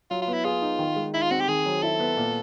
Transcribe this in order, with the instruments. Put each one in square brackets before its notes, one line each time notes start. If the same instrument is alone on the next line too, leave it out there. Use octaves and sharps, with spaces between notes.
[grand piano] F#3 [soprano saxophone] F4
[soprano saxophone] F4
[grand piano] B3
[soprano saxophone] E4
[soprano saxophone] F4 [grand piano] G#4
[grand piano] D#4
D#3
G#3
[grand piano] D#4 [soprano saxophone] E4
[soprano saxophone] F4
[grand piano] C4 [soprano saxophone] F#4
[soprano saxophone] G4
[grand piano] D#3 [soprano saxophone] G#4
[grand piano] F#3
[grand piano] E4 [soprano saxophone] A4
[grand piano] B3
A#2